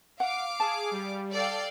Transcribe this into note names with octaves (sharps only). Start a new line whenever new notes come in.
F5 F#5 D6
G#4 A5
G3
A4 D5 F5 G5